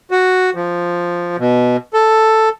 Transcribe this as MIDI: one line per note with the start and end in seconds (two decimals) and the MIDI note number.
0.11 0.50 66
0.55 1.36 53
1.39 1.77 47
1.94 2.49 69